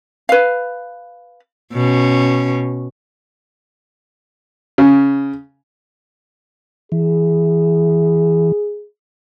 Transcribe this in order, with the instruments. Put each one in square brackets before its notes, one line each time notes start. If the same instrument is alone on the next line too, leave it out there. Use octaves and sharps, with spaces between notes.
[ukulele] B4 F5
[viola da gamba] B2 C#4
[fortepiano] C#3
[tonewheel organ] E3 [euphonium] G#4